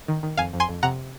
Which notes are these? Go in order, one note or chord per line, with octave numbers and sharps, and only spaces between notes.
D#3
D#3
F2 F5 G#5
F2
G#5 C6
F2
C3 F#5 A#5